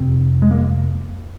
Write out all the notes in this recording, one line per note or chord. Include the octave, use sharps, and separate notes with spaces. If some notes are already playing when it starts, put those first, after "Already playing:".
Already playing: F2 C3 C4
G#3
A#3